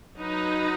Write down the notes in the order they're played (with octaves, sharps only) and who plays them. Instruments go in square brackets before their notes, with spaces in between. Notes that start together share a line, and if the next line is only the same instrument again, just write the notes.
[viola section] F#3 D#4 B4